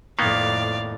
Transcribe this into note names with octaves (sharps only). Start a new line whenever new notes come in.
F2 A2 D#3 A#3 B3 D5 F5